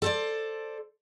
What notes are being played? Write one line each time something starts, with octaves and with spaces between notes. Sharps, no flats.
A4 C5 D5